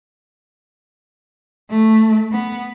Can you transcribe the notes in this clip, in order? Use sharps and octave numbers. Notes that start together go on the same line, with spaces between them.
A3
B3